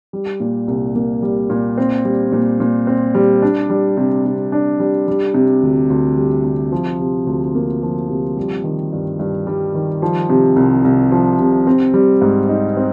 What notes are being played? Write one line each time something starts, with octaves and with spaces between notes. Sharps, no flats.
G3
A#2
C2
A#3
G3
A#2
C4
G3
A#2
A#2
C4
G3
D4
G3
C3
C3
D4
G3
G3
C3
D2
D2
G3
C3
F3
C3
D2
A#3
F3
C3
G3
D#3
G2
G2
G3
D#3
F3
C3
C2
C2
F3
C3
C4
G3
G#2
D#4
C4